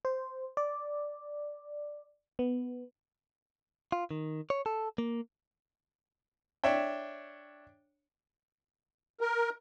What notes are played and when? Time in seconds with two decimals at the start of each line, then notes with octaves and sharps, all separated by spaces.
0.05 C5
0.57 D5
2.39 B3
3.92 F4
4.11 D#3
4.50 C#5
4.66 A4
4.98 A#3
6.64 D4 C#5 E5 G5
9.21 A#4